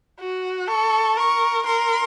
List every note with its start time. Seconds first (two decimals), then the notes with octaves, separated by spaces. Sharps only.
0.20 F#4
0.68 A4 C#6
1.17 A#4 C#6
1.66 A#4 C6